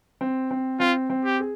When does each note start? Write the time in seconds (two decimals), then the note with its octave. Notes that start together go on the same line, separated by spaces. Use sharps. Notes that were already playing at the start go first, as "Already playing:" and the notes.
0.21 C4
0.51 C4
0.80 C4 F4
1.10 C4
1.25 G4
1.40 G#4